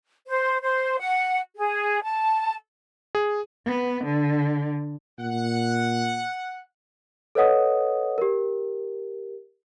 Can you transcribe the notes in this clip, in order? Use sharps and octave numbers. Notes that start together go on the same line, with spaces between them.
C5
C5
F#5
G#4
A5
G#4
B3
D3
A#2 F#5
A4 B4 C#5 D#5 F#5 D#6
G4 A#4